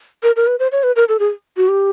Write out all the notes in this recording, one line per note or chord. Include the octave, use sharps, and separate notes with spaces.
A#4
A#4
B4
C5
C#5
B4
A#4
A4
G#4
F#4
G4